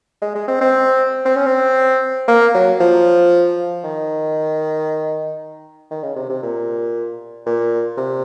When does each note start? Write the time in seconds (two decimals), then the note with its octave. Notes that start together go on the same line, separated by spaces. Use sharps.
0.21 G#3
0.35 G#3
0.48 C4
0.61 C4
1.25 C4
1.36 C#4
1.46 C4
2.28 A#3
2.54 F#3
2.80 F3
3.84 D#3
5.91 D#3
6.03 C#3
6.16 C3
6.29 C3
6.42 A#2
7.46 A#2
7.97 C3